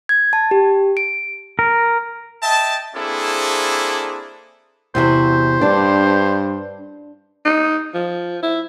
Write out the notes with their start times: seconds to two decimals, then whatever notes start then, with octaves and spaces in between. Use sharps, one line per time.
0.09 G#6
0.33 A5
0.51 G4
0.97 D7
1.59 A#4
2.42 D#5 E5 G5 A5
2.95 A#3 C4 D4 E4 G#4 A4
4.95 E2 C3 F#4 C5
5.61 G2 D4
7.45 D#4
7.94 F3
8.43 E4